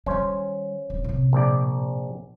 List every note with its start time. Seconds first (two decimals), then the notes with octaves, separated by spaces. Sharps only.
0.06 D#3 G3 C#4 C5
0.90 D1
1.04 A2 C3
1.33 A#1 D5